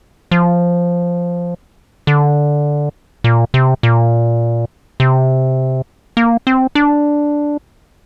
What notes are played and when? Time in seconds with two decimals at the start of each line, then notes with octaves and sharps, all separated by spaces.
0.31 F3
2.07 D3
3.24 A#2
3.54 C3
3.83 A#2
5.00 C3
6.17 A#3
6.47 C4
6.75 D4